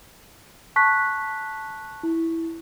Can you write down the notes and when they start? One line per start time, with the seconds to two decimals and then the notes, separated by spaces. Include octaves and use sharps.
0.76 A5 C#6 F#6 B6
2.03 E4